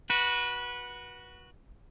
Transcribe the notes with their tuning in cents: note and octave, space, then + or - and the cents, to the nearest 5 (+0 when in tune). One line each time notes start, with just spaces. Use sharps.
F#4 +0 B4 -25